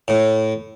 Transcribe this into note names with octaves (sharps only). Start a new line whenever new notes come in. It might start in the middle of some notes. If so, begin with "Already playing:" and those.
A2